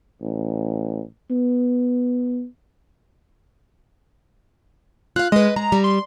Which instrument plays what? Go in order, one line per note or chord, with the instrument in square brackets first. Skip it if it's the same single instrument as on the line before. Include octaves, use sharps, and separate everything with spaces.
[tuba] A1
B3
[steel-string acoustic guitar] F4 F5 [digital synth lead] F#6
[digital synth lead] G#3 [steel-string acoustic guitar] B4 D#5
[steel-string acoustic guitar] G#3 [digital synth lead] A#5
[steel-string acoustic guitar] G3
[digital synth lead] C6